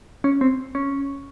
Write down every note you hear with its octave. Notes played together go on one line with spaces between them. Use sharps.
C#4
C4
C#4